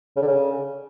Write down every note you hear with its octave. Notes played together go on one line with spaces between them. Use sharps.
C#3
D3
C#3